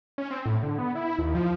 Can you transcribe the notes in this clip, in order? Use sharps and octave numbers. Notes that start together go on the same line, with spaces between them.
C#4
C4
A2
D3
B3
E4
D#2
F3